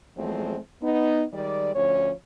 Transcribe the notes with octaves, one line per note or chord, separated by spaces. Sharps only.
E2 F3 F#3 G#3 A3 C4
B3 D#4
D#3 G3 G#3 D5
D2 F3 C#4 C#5